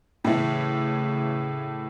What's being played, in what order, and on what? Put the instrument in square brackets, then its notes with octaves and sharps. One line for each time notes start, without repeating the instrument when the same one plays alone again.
[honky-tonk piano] A2 E3 A3 [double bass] C#3